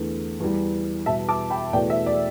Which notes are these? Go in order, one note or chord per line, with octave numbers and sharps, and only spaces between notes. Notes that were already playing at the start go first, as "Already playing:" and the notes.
Already playing: E2 D3 A3
E2 E3 G3
E2 B2 G3 E5 A5
A5 D6
G5 B5
E2 B2 A3 D5 G5
E5
D5